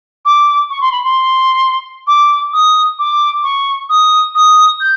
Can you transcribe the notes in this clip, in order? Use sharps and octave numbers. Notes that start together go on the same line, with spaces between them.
D6
C#6
C6
B5
C6
D6
D#6
D6
C#6
D#6
D#6
G6